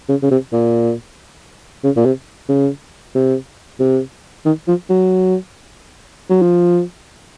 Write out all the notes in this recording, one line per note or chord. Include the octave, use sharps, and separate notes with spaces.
C#3
C#3
C3
A#2
C#3
A#2
C3
C#3
C3
C3
D#3
F3
F#3
F#3
F3